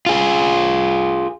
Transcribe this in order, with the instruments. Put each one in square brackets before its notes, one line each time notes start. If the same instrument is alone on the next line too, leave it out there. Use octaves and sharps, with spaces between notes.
[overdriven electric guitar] F4 G#4